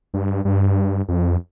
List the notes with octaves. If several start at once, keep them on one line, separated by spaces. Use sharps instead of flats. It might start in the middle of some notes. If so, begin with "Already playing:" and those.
G2
G2
F2